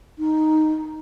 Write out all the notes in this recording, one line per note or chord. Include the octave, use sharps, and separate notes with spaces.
D#4